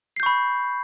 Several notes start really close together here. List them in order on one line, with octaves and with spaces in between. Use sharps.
C7 G6 C#6 B5